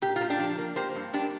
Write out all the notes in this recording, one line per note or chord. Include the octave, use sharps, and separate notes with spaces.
A#2 G4
F4
A#2
D4 G4
F3
A#3
A#3 G4 C5
G2
G2 D4 G4